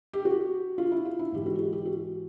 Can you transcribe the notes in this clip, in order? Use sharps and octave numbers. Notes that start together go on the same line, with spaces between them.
G4
F#4
F4
E4
F4
E4
G#2 E3 G#3 G4
F#4
F#4
G4
F#4